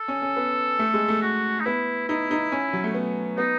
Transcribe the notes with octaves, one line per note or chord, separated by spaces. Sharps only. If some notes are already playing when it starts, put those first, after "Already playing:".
Already playing: A4
C#4
C#4
B3
A3
G#3
A3
F#4
D#4
B3 E4
D#4 E4
D#4
C#4
F#3
A3
B3
B3 D#4